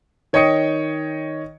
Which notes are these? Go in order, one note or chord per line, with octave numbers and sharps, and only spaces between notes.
D#3 C#5 D#5 G5 D#6 C#7